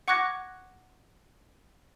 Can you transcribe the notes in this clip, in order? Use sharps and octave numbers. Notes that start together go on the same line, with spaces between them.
F#5 C#6 D6 F#6 G#6 A#6